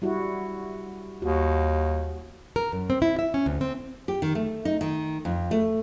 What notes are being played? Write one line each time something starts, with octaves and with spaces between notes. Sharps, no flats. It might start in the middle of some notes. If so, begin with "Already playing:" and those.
G3 E4 F#4
D#2 F#4
A#4
F#2
C4
E4
E5
C#4
D2
C4
G4
D#3
A3
D#4
D#3
F2
A3